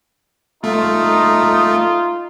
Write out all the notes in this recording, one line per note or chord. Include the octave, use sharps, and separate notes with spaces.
A3 D#4 F4